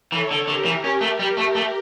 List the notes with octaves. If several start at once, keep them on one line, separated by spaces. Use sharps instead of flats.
E3 A4 C#5
D3
D3 G4 A#4
E3
C#4 G4 A#4
A3
G3
A3
A3